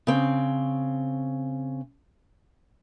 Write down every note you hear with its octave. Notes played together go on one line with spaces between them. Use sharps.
C#3 C4